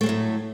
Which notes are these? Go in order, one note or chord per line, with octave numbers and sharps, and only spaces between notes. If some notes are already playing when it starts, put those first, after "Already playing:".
A2 F#3 G#3 A3